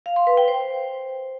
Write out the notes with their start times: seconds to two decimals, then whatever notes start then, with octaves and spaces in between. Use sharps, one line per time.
0.06 F5
0.16 C6
0.27 B4
0.37 G5
0.48 C5